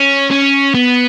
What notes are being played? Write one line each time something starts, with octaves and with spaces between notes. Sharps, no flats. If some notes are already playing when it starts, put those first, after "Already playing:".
Already playing: C#4
C#4
B3